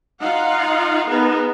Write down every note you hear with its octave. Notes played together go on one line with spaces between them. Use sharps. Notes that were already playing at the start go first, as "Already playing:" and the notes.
D#4 F4 F5 F#5
B3 D#4 G#4 A#4